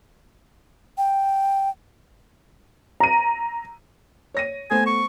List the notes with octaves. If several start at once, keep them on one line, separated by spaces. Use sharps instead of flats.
G5
A#5 D#7
C#5 A#6 D#7
A3 B3 C5 G#5
C#6